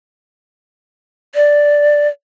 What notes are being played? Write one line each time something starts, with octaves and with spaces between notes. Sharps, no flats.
D5